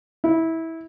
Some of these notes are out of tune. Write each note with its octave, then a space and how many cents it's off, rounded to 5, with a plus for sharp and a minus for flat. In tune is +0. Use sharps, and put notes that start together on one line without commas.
E4 -20